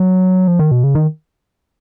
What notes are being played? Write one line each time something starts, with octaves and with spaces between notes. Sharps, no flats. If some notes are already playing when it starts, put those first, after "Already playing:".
Already playing: F#3
F3
D#3
B2
C#3
D#3